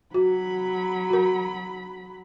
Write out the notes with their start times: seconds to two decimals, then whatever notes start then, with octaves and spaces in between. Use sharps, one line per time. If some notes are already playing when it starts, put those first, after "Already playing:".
0.14 F#3 F#4 B5
1.10 F#4 A#4